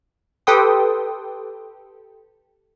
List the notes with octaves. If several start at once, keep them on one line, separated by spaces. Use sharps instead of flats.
G4 A4 B4 G5 C6 D#6